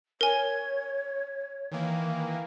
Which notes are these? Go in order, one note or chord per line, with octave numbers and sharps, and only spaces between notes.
A#4 C#5 G#5
D#3 E3 A#3